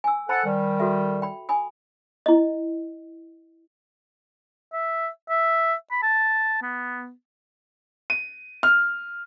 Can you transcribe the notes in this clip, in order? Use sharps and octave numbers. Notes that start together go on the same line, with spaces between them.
G#5 E6
A4 C5 F#5 A5 B5
D#3 G3
F#4 A4 E5
G5 B5
G#5 B5 D#6
E4 D#5
E5
E5
B5
A5
B3
D#7
F6